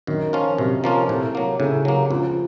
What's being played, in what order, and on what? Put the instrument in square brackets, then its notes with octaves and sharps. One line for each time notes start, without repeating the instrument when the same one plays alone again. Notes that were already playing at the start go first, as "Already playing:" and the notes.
[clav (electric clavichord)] F#2 [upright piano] D#3
[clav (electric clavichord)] F3 A#3 C#4 F4
[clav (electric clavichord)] F#2 [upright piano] C3
[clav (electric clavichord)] F3 A#3 C#4 F4
[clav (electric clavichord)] A2 [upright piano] C3
[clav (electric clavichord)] F#3 A#3
[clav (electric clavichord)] A2 [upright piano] C#3
[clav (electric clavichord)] F#3 A#3
[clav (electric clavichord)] C#2 [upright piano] F3